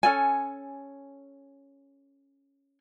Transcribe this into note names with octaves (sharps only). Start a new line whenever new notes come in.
C#4 A4 G#5